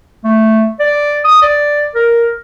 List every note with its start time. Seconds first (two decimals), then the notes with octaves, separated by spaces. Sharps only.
0.24 A3
0.80 D5
1.25 D#6
1.42 D5
1.95 A#4